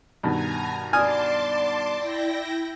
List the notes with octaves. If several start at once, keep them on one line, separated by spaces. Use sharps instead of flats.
G2 B2 D#3 G#5 A#5
D5 G#5 A5 C6 D6 D#6 F6
E4 G5 A#6